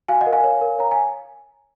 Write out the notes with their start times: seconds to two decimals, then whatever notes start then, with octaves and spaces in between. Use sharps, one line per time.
0.08 F#4 F5 G#5
0.21 D#5 F#5
0.26 A#4
0.33 F5 G#5
0.44 C#5
0.61 A#4
0.79 C#5 A#5
0.91 G#5